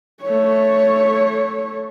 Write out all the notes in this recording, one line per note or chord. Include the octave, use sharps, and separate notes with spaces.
A3 C#5